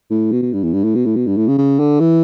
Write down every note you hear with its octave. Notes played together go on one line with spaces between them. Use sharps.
A2
B2
B2
G2
E2
G2
A2
B2
A2
B2
G2
A2
C#3
C#3
D3
E3